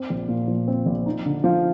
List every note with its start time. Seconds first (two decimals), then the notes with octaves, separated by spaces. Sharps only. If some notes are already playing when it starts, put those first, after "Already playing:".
Already playing: C4
0.10 A#1
0.29 A#2
0.48 F3
0.68 C4
0.86 A#1
1.06 D#4
1.26 D3
1.44 F3